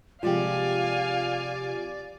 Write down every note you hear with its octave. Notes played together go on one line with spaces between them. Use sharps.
C3 F3 G#3 F4 G4 D5 F5 G#5